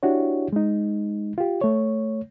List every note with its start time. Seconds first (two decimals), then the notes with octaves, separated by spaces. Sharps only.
0.03 D4 E4 F#4 G4 C#5
0.53 G#3 D#4
1.38 F4 G4
1.61 A3 C#5